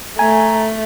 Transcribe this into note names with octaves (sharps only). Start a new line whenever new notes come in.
A3 G#5 A#5